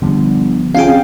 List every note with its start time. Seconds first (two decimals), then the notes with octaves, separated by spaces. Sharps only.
0.02 G1 D3 F3 G3
0.74 C3 C#4 F4 G#4 F5 G5